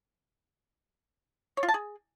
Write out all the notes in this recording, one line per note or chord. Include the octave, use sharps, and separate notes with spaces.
C#5
F4
A5
G#4